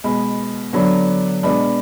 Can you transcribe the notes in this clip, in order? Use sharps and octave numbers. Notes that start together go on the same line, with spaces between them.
B2 G#3 B3
D3 F#3 B3 D4
B2 G#3 B3 D4